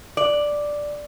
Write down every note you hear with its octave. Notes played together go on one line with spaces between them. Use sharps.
D5